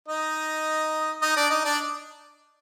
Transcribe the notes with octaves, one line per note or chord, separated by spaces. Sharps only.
D#4 D#5
D#4 D#5
D4 D5
D#4 D#5
D4 D5